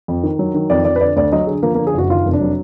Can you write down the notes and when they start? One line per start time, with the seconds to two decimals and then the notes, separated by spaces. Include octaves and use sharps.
0.08 F2
0.23 D#3
0.39 F#3
0.54 D#3
0.70 F2 D5
0.85 F2 D5
0.96 B4
1.00 D3 D5
1.16 D2 D5
1.32 F#3 D#5
1.47 D3 G#4
1.63 F3 A#3
1.75 A#3
1.78 D3
1.87 G#4
1.94 F#1 F#4
2.09 D#3 F4
2.25 F1
2.33 D4
2.41 F#3